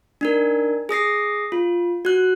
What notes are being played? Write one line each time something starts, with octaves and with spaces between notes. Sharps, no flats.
D4 D#4 A#4
G#4 D#6 A#6 C7
F4
F#4 F#6